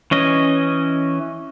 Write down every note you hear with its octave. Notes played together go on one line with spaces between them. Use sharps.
E3 C#4 D#5